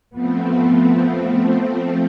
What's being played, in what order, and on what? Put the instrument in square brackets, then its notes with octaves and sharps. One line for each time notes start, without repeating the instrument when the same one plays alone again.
[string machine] F3 A3 C4 [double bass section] B3